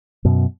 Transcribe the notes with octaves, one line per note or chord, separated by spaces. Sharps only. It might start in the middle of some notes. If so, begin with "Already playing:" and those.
F#2 B2